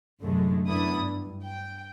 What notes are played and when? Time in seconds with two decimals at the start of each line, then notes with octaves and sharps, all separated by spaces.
0.22 C2 F#2 A2 D3 G#3 A3
0.68 F#2 B3 D4 E4 D#6
0.97 G2
1.43 G5